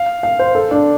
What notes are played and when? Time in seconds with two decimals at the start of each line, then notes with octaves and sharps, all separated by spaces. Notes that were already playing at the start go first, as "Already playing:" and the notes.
Already playing: F5
0.23 F5
0.39 C5
0.55 A4
0.71 D4